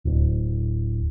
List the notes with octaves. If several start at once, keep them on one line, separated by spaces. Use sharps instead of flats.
D1